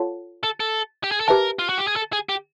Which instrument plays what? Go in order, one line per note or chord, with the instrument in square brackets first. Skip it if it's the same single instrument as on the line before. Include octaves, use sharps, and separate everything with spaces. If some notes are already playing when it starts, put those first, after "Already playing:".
Already playing: [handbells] F4 A4 C#5 F#5 A5
[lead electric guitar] A4
A4
G4
G#4
A4
[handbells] G4 B4 E5 A5 [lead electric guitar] A#4
[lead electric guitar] F4
F#4
G4
G#4
A4
G#4
G4